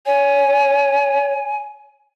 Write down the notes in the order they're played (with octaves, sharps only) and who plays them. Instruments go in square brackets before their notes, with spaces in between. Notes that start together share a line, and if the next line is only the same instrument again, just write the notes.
[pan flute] C#5 [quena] G#5